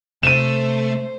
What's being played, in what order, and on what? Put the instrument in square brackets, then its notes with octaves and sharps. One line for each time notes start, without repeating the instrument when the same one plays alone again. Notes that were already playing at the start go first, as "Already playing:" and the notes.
[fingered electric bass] C3 [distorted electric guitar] A3 [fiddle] C5 [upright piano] D#7 E7